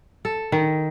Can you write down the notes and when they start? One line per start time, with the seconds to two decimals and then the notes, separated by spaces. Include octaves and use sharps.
0.25 A4
0.52 D#3